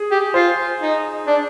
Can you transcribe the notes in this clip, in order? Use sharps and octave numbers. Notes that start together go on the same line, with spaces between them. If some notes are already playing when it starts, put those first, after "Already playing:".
Already playing: G#4
G4
F4 C5
D#4
D4